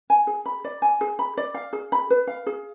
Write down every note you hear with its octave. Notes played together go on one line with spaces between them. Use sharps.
G#5
G#4
B5
D5
G#5
G#4
B5
D5
F5
G#4
B5
B4
F5
G#4